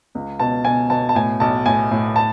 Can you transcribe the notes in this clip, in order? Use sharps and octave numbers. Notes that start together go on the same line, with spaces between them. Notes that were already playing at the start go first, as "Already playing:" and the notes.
C#2
B2 A5
B2 G#5
B2 A5
A5
A2 G#5
B1 A5
A2 G#5
A2
A5